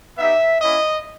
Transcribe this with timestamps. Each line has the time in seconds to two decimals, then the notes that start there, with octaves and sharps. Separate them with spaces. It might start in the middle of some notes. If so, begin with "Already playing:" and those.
0.17 B3 D#4 G4 E5
0.61 A#3 C#4 E4 D#5